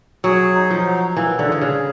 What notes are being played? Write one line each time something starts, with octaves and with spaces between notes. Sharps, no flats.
F#3 G#4
D#4
F3
F#3
E3 A#3
D3
G#4
D3
C#3